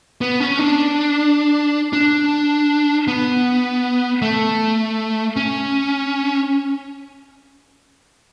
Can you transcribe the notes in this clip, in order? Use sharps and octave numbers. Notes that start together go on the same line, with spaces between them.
B3
C#4
D4
D4
B3
A3
C#4